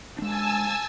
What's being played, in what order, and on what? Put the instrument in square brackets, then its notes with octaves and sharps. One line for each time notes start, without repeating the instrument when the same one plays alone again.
[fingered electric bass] G#3 D4 [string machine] G#5 A5 E6